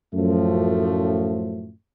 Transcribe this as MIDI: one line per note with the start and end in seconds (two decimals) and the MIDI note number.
0.14 1.70 42
0.14 1.70 45
0.14 1.70 53
0.14 1.70 57